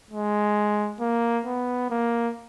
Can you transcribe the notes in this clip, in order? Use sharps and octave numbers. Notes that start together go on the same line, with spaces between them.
G#3
A#3
B3
A#3